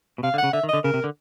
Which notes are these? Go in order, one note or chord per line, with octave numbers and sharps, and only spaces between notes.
B2
C3 F5
D3
F#5
C#3
D3 E5
D#3
D#5
D3
C#3 A#4
C3
D3